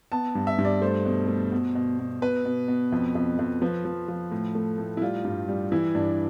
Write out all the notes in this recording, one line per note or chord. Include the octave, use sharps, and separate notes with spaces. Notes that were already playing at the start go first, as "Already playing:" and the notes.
B3 A5
G2
E5
G2
D5
A3 C5
B2
A3
B2
B2
B2
B2 B4
B2
B2
F2
F2
F2
F3 B4
F3
F3
A2
A3
A2
E4
G3 F4
G2
G3
E3 E4
G2 D4